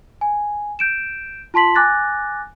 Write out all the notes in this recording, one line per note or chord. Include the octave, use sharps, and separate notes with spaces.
G#5
G6 D7 E7
F4 A5 C6 B6 F#7
G#5 D6 F#6 A6 A#6